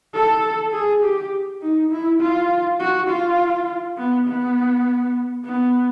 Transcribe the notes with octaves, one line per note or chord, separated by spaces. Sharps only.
A4
G#4
G4
D#4
E4
F4
F#4
F4
B3
B3
B3